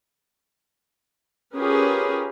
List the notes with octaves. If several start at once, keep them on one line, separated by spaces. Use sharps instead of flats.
C#4 F4 G4 G#4 A#4 B4